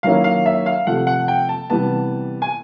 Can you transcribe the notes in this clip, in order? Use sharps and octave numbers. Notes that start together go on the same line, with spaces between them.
D#3 F#3 A#3 C#4 E4 F5
F5
E5
F5
C3 F3 A3 F#5
F#5
G5
A5
C3 E3 G3 B3 A5
G#5